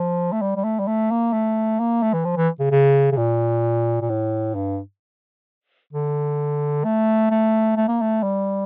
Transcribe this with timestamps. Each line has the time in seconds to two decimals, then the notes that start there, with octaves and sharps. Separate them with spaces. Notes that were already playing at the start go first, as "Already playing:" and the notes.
Already playing: F3
0.32 A3
0.42 G3
0.56 G3
0.64 A3
0.80 G3
0.88 A3
1.11 A#3
1.33 A3
1.79 A#3
2.02 A3
2.13 E3
2.25 F3
2.36 E3
2.59 C#3
2.71 C#3
3.12 C#3
3.17 A#2
4.01 A#2
4.10 A2
4.55 G2
5.93 D3
6.84 A3
7.31 A3
7.76 A3
7.88 A#3
8.01 A3
8.23 G3